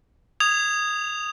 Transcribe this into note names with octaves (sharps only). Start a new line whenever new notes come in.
D#6 G#6 F7